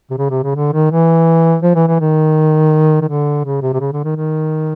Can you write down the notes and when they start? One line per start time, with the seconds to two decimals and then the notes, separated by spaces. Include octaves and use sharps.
0.10 C3
0.18 C#3
0.30 C3
0.43 C#3
0.55 D3
0.73 D#3
0.91 E3
1.63 F3
1.75 E3
1.88 E3
2.00 D#3
3.01 D#3
3.08 D3
3.45 C#3
3.62 C3
3.73 C3
3.80 C#3
3.93 D3
4.04 D#3
4.16 D#3